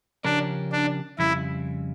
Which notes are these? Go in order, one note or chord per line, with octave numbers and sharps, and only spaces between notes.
C#3 F3 C#4 D4 G4 A#4
D4
F2 C#3 G3 E4